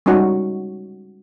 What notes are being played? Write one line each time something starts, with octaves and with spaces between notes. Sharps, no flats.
G3 G#3 C#4 D#4 F#4 C#5